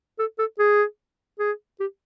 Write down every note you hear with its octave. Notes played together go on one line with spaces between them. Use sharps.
A4
A4
G#4
G#4
G4